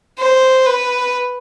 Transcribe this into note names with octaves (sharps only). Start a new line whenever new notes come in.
C5
B4